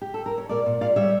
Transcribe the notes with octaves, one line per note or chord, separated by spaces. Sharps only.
G4
A4
A#4
C#5
A#2 A#4 D5
A#2
A#2 D5 F5
G3 C#5 E5